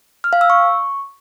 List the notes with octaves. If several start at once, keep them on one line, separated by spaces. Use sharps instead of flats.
F6
F5
E6
C#6